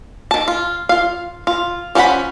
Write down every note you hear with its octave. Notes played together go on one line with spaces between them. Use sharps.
D#3 A5
F4
F4 F5
F4
F3 C#4 E4 F#5 B5